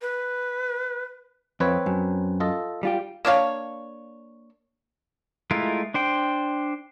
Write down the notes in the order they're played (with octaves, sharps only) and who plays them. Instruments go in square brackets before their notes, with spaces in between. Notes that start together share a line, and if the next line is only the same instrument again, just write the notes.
[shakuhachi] B4
[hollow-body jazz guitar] F2 [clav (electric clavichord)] C4 B4 C#5
[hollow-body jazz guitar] F#2
[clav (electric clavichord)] F4 A4 D#5
[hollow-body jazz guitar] G3 F4 G4
[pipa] A#3 D4 C#5 F5
[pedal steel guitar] G#3 A3 E4 F4 A#4
D4 C5 G5